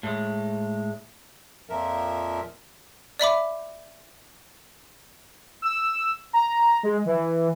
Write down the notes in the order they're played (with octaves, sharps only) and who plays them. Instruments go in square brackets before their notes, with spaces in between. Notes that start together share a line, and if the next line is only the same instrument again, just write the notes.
[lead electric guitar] A2 G#3
[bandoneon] F2 A#2 F3 A#4 E5
[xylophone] D5 E5 B5 D6
[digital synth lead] E6
A#5
G#3
E3